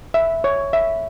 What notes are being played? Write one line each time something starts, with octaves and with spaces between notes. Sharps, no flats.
E5
C#5
E5